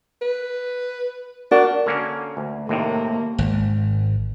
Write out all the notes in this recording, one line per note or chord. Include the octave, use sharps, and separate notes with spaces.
B4
D4 F#4 A#4 F#5
D3 A#3 C#4
D2
D#2 A2 C3 A#3
G#1